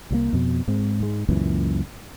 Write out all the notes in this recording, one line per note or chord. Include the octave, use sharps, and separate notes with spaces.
C2 F#3 A#3
F2 B2
G#2 G#3 C4
G#2 G#3
C#2 F#2 A#2 E3